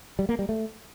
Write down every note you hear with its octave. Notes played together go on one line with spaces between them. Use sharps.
G3
A#3
G3
A3